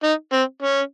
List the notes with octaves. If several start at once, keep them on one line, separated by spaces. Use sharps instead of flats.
D#4
C4
C#4